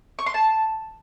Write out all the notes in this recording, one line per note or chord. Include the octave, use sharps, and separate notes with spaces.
C#6
C6
A5